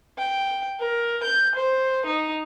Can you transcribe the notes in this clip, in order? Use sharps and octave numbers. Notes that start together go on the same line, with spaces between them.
G5
A#4
G6
C5
D#4